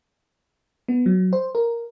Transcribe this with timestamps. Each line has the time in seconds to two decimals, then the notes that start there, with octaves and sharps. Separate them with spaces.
0.88 B3
1.06 F#3
1.33 C5
1.55 A#4